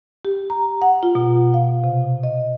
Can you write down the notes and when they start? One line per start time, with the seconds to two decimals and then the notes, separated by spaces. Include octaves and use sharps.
0.25 G4
0.50 A#5
0.82 F#5
1.03 F4
1.15 B2
1.54 F5
1.84 C3
2.23 D#5